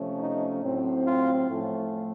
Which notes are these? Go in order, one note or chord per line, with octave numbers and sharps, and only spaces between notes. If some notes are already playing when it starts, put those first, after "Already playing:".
Already playing: C3 F3 A3 C#4
D#4
A2 F#3 C4
F4
A2 F3 A3 C#4